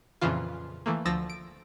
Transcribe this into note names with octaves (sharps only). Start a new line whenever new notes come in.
F2 A#2 C#3 E3 F4
E3 A3 A#3
D2 F3 E6 A6 A#6
D7